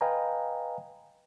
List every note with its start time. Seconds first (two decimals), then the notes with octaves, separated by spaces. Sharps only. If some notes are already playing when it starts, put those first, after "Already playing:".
0.01 B4 D#5 F5 G5 G#5 A#5